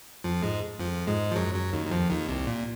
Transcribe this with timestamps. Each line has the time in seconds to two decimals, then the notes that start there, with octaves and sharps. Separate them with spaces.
0.24 F2 F3
0.42 G#2 G#3
0.79 F2 F3
1.07 G#2 G#3
1.32 F3
1.36 F#2 F#3
1.54 F#2 F#3
1.72 D#2 D#3
1.87 D#3
1.91 F2 F3
2.09 D#2 D#3
2.29 C2 C3
2.47 A#2